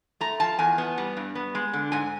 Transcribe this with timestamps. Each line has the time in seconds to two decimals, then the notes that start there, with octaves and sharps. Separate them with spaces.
0.21 A3 A#5
0.40 F3 A5
0.59 E2 G#5
0.78 B3
0.98 G3
1.17 G2
1.35 B3
1.55 G#3
1.73 D3
1.92 G#2 G#5